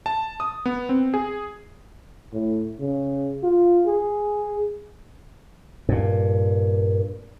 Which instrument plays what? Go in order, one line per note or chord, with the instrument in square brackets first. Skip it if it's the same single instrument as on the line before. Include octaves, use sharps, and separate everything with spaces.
[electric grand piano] A5
D#6
B3
C4
G#4
[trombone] A2
C#3
F4
G#4
[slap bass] G2 A#2